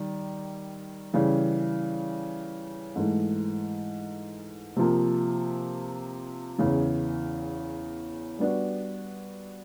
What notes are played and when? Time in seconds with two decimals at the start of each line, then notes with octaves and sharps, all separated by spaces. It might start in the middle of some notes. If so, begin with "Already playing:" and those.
Already playing: D#3 G3
1.14 C#3 E3 G3
2.96 G#2 E3 A3
4.76 C3 F3 A#3
6.58 E2 C#3 E3
8.39 G3 B3 D4 F#4